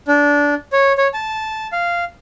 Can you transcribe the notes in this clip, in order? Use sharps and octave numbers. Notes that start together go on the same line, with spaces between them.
D4
C#5
C#5
A5
F5